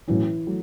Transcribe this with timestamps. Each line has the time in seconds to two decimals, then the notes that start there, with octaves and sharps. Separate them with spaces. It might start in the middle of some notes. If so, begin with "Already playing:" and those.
0.08 A2 E3 F#3 C#4
0.47 F#3 A3